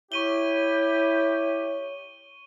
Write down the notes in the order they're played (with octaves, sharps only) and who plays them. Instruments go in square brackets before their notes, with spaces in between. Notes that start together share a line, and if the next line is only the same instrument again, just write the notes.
[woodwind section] E4 G4 [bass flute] C#5 [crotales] C#6 D#7 G7